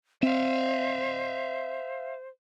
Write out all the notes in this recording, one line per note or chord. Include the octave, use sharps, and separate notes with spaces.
C4 C5 E5 F5